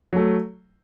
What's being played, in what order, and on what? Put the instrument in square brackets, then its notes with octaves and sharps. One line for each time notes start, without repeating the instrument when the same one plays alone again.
[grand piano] F#3 A3